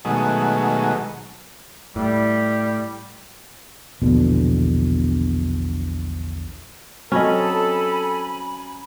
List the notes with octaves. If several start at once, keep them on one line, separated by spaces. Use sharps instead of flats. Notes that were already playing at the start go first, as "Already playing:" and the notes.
B2 D#3 F#3 G#3 A3
A2 G3
A#1 E2 B2 D3
F#3 C4 C#4 A4 D#5 G#5 B5